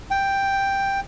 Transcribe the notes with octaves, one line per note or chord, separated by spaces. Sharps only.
G5